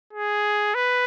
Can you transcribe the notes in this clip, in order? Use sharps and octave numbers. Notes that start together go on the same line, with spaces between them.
G#4
B4